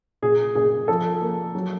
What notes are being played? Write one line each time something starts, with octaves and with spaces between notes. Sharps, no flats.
A#2 G#4
A#2 G#4
F3 A4
A#3
F#3